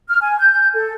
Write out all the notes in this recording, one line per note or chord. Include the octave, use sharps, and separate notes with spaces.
F6
G#5
G6
A4